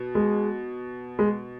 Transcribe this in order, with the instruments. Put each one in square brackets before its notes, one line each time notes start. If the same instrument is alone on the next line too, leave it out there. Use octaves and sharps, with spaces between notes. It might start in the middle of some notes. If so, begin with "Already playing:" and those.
Already playing: [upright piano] B2
[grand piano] G#3
G#3